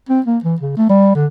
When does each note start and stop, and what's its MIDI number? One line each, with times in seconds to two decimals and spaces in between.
0.09 0.21 60
0.26 0.39 58
0.44 0.56 52
0.61 0.75 49
0.77 0.89 57
0.90 1.13 55
1.15 1.27 50